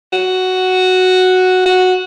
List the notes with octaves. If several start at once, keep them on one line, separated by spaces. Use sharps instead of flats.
F#4
F#4